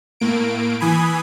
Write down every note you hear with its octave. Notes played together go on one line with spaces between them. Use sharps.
A2 A#3 D7
E3 G#5 B5 D#6